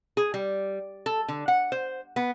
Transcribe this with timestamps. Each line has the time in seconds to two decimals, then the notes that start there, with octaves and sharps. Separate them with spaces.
0.17 G#4
0.34 G3
1.06 A4
1.28 D3
1.48 F#5
1.72 C5
2.16 B3